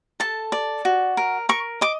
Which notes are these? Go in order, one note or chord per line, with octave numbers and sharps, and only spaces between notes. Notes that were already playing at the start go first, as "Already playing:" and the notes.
A4 A5
D5
F#4
A#4
A#4 C#6
D#5 D6